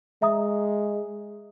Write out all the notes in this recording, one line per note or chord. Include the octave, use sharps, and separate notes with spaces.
G#3 E5 A#5 D#6